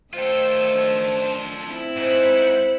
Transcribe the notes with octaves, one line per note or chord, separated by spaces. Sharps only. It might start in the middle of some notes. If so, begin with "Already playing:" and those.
D#3 A3 F4 A4 C5 G5 E6
D4
C4 E4
G#2 C5 F#6 C#7